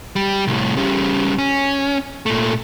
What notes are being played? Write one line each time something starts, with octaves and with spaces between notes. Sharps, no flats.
G3
C2 A2
C#3 G3
C#4
A#2 A3